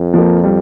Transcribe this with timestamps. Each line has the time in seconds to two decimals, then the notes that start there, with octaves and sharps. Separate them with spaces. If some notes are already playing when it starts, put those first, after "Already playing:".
Already playing: F2
0.14 F3 A#3
0.44 G3